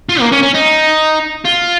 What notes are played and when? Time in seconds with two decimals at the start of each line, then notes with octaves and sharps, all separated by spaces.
0.09 F4
0.20 A#3
0.32 C#4
0.43 C#4
0.55 D#4
1.45 F4